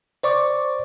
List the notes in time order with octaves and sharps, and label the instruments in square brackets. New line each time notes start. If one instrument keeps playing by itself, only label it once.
[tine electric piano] C5 D5 C#6 D6